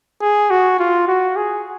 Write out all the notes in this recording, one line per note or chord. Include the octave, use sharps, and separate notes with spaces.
G#4
F#4
F4
F#4
G#4